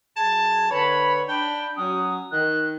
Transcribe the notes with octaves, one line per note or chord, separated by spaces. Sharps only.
F#2 G#4 A5 G#6
D3 B4 C#5 B5
D4 G5 B5
F#3 C#4 D#6
D#3 F#6